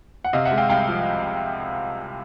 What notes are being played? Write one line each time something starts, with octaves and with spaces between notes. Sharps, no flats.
F#5
C3 D#5 F5
E5 F#5
G#3
F5 G5
C2 F5 G5
F3